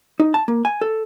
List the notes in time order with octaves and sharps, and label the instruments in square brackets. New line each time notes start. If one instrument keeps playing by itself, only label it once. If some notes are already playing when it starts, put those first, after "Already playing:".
[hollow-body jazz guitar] D#4
A5
A#3
G#5
A4